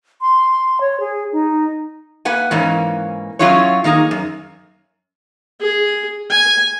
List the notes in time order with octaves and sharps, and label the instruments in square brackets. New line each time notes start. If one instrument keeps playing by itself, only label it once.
[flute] C6
C#5
G#4
D#4
[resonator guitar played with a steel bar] A#3 B4 F#5 G#5
G#2 E3 A#3 C#4
F#3 C#4 E4 F4 G#4 C#5
D#3 A#3 D#4 G#4
F#2
[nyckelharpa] G#4
G#5